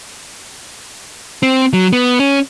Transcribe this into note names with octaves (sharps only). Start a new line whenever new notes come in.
C4
F#3
B3
C#4